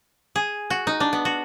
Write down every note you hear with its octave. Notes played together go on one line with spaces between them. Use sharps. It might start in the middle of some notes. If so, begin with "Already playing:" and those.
G#4
F#4
D#4
D4
B3
F#4